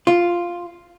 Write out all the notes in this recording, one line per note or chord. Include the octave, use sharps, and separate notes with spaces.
F4